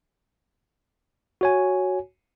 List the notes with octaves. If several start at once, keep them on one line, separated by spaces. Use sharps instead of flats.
F#4 C#5 G#5